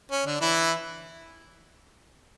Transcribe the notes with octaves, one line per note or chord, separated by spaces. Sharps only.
C#4
D3 D4
E3 E4